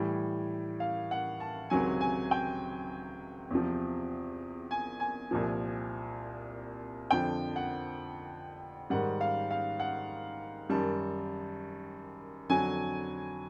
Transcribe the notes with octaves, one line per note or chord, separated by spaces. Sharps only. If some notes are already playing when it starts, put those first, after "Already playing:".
Already playing: A2 E3 G3
F5
F#5
A5
C#2 C3 D#3 F#3 G#5
G#5
G5
E2 C3 F3
G#5
G#5
C2 A#2 F3
F2 D3 F3 G5
F#5
G#2 D#3 G3 F#5
F5
F5
F#5
F#2 D#3 G3 A5
F2 D3 F#3 G#5